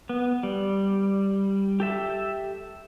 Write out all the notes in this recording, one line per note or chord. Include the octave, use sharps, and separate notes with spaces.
B3
G3
G4 A4 E5